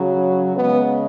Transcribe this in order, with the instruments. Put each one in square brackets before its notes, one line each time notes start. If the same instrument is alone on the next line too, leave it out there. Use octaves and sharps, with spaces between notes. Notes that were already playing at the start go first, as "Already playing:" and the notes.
Already playing: [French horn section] C#3 F#3
C#3 G#3 B3